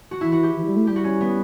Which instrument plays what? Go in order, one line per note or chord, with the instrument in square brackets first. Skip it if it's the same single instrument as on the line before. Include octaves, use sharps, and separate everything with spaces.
[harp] F#4
[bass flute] E3 [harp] E4
[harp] F#4
G4
[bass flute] E3
G3
A3
[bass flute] G3 [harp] G4
[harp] F#4
C#4
B3